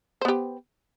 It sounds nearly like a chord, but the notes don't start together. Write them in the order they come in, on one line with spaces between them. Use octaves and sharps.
C5 B3 G4